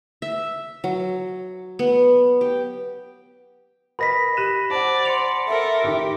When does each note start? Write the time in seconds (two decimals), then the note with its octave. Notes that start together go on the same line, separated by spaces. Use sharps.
0.22 E5
0.84 F#3
1.79 B3
2.41 G4
3.99 A#4 B4 D#5 B5 A#6 B6
4.37 G4 F#6 D#7 E7
4.71 C5 D5 F#5 A5
5.05 C6 C#7 F7
5.48 A4 A#4 E5
5.84 A1 D#3 G4